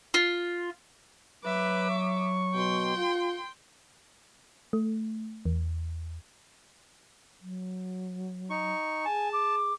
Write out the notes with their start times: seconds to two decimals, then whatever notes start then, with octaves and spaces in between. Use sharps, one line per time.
0.14 F4
1.45 F#3 B4 E5 D6
1.90 C#6
2.55 B2 G5 C6
2.97 F4
4.73 A3
5.45 E2
7.41 F#3
8.50 D#4 C#6
9.05 G#4 G#5 A5
9.33 D6